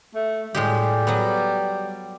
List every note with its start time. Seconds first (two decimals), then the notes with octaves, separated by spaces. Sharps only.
0.15 A3
0.55 A2 G3 G#3 G4
1.07 F#3 B3